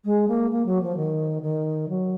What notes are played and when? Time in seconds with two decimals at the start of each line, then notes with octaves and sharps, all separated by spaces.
0.05 G#3
0.28 A#3
0.51 A#3
0.66 F#3
0.82 F3
0.97 D#3
1.42 D#3
1.89 F#3